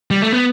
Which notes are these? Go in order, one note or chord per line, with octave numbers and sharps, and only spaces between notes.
G3
A3
B3